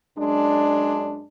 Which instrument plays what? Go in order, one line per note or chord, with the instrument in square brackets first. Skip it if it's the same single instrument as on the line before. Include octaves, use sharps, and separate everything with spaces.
[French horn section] F#2 G#3 D4